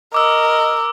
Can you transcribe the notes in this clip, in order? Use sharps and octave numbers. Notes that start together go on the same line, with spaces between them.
A#4 D#5 D6 E6